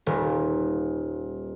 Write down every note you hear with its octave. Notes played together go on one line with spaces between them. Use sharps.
D#1